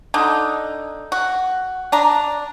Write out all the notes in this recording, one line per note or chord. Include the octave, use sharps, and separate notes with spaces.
D3 D#4
F#4
D4 A#5